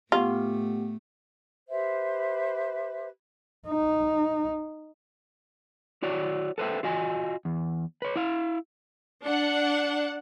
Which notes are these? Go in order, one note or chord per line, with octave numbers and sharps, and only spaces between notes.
A2 A3 B3 F4 G4
G4 B4 C5 E5
D#4
E4 F#4 C#5 D5
A4 B4 C5 E5 G5
F4 F#4 D#5 G#5
E2
B4 C#5
E4 F5
D4 F#5